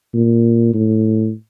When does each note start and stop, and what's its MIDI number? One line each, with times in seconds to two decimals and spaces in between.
0.14 0.73 46
0.74 1.32 45